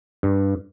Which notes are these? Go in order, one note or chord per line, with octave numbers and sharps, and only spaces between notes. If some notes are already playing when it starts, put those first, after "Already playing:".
G2